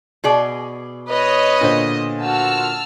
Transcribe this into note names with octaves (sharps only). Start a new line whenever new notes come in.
B2 G#4 D5
B4 C#5 D#5
A#2 D3 C5
F#4 A5 E6 F6